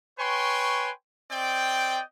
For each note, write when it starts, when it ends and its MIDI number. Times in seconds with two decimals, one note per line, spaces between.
0.19 0.91 71
0.19 0.91 73
0.19 0.91 79
0.19 0.91 80
0.19 0.91 84
0.19 0.91 85
1.32 2.02 60
1.32 2.02 74
1.32 2.02 75
1.32 2.02 79